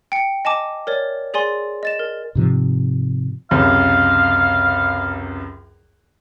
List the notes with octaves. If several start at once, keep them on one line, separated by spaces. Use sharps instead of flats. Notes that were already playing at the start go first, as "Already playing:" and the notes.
G5 C#7
D#5 G#5 A5 D6
A#4 C#5 D5
G#4 D5 G#5 C6
D#5 A6 E7
A#4
G#2 C3 F3
C#2 F#2 C3 F5